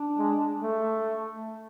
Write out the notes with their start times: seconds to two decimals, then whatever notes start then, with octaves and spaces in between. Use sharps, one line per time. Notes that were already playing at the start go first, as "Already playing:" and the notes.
Already playing: D4
0.18 G#3
0.63 A3